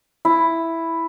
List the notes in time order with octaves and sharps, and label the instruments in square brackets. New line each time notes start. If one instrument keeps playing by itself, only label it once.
[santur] E4